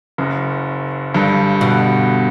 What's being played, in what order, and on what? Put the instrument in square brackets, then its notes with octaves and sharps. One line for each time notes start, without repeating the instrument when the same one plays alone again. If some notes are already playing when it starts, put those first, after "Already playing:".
[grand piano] F#1 F#2
G1 G2
[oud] B2